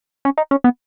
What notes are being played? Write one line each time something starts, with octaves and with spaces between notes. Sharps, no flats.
C#4
D#4
C#4
B3